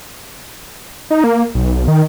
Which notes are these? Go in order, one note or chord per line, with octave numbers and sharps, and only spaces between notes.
D#4
A#3
B1
D#3